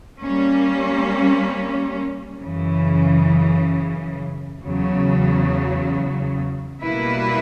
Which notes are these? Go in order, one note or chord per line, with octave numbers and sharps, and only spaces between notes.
G3 A#3 C#4
F#2 C#3 E3
E2 C#3 F#3
B2 G3 A#3 E4 B4